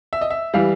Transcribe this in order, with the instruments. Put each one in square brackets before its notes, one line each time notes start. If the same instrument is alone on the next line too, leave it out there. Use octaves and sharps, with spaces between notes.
[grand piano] E5
D#5
E5
E3 G3 F5